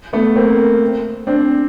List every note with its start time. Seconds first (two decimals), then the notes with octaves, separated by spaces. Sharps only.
0.13 A3 B3
0.36 A#3 C4
1.27 C4 D4